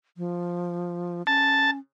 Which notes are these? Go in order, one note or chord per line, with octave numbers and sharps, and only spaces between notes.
F3
C#4 A5